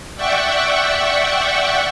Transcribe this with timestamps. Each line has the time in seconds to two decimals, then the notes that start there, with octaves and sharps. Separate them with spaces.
0.17 D5 E5 F#5 G5 C#6